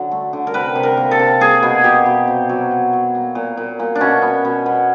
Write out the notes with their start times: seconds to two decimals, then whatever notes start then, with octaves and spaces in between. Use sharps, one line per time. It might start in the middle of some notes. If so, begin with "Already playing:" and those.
Already playing: D3 F#3
0.12 A3
0.33 D3
0.47 A#4
0.54 C3 B4
0.75 C3
0.83 A#4
0.97 A#3
1.11 A4
1.19 C3
1.40 A#3 G#4
1.63 B2
1.84 B2 G4
2.06 B2
2.27 C3
2.49 F#3
2.71 F#3
2.93 F#3
3.15 A#3
3.35 A#2
3.57 A#2
3.79 A#2
3.95 D4
4.00 B2 C#4
4.22 B3
4.45 B2
4.66 B2